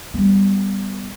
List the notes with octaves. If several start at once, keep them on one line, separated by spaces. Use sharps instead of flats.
G3 B3